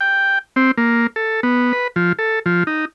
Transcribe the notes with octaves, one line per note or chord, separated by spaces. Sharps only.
G5
C4
A#3
A4
B3
B4
F3
A4
F3
D#4